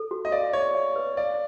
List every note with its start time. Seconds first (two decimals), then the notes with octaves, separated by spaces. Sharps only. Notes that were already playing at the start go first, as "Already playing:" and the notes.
Already playing: A4
0.11 F#4
0.25 D#5
0.32 D5 F5
0.53 C#5 D5
0.75 E5
0.96 B4
1.17 D5 F5